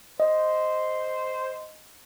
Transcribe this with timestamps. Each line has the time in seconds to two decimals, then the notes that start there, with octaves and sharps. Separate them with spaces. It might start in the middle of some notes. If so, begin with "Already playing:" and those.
0.20 C5 D#5